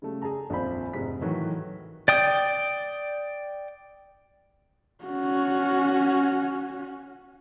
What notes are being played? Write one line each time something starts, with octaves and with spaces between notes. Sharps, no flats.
C#3 G3 A3
G#4 A4 A5 A#5
D#1 A#1 F2 F4 C5 B5
F1 G#2 C3 B6
A2 D#3 E3 F#3
D5 G5 D#6
C#4 F#4